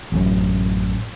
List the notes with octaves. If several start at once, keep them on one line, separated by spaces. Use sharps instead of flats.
A1 F#2